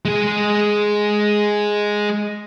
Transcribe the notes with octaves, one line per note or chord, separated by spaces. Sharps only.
G#3 G#4